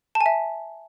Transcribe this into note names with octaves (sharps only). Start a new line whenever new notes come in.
A5
G#5
E5